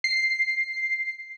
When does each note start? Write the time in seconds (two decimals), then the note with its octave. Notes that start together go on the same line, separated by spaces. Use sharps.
0.04 C7